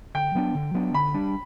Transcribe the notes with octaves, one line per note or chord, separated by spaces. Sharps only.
D3 G5
F#3 B3 D4
D3
F#3 B3 D4
D3 B5
G3 D4